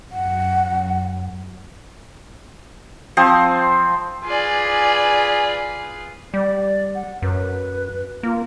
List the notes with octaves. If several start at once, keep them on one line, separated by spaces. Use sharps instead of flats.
F#2 F#5
F3 C4 C5 D#6
F4 G#4 B4 D5 G#5
G3 D5
F#5
F#2 B4
A#3 F4